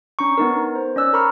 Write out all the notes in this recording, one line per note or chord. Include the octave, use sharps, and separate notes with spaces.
C#4 D4 A#5 C#6
B3 D#4 A#4
C5
C#4 D5 E6 F#6
A#4 A#5 B5 C#6 F6